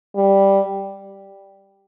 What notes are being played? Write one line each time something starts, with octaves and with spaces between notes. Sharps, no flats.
G3